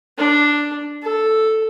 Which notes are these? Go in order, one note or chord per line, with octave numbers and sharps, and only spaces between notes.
D4
A4